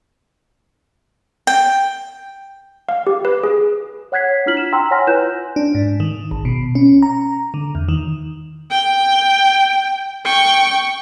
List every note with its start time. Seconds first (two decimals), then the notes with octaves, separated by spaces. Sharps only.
1.47 G5
2.89 F5
3.07 G4
3.25 B4
3.44 G#4
4.12 C#5 F#5 F#6 G#6 B6 C7
4.46 D4 E4 F4 F6 B6 F#7
4.57 E7
4.73 G5 A#5 C6 E6 B6
4.91 C#5 F#5 G#5 C6 F6 A#6
5.07 E4 F4 B4 F#6 G6 E7
5.56 D4
5.75 G#2
6.00 D#3
6.31 G#1
6.45 B2
6.75 C#4
7.03 A#5
7.54 D3
7.75 E2
7.88 D#3
8.71 G5
10.25 G5 C#6